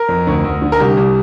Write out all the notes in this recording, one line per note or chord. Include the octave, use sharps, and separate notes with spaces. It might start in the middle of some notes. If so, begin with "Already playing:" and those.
Already playing: A#4
F2
D2
D2
D3
A#4
C2 G4
C2